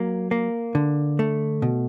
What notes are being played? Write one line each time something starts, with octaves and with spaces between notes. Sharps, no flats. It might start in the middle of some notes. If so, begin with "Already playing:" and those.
Already playing: F#3 A#3
A#3
D3
A3
B2